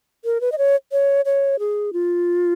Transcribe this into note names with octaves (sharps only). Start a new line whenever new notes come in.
A#4
B4
D#5
C#5
C#5
C#5
G#4
F4